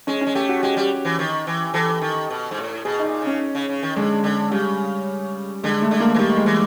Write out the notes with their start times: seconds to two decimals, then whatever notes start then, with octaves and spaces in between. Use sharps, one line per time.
0.07 G#3 C#4
0.21 C#4
0.27 G#3
0.35 A3 G4
0.49 F#4
0.63 G#3 G4
0.77 G3
1.05 E3
1.19 D#3
1.47 E3
1.74 E3 A4
2.01 D#3
2.30 B2
2.51 G#2
2.57 A2
2.85 B2 G#4
2.99 A#2 D#4
3.22 C#3
3.27 C#4
3.55 C#3
3.69 C#3
3.83 D#3
3.96 D3 G#3
4.24 D3 G#3
4.51 C#3 G3
5.63 D3 G#3
5.82 A3
5.91 D3
6.00 A#3
6.14 E3
6.19 D#3 G3
6.37 G#3
6.46 E3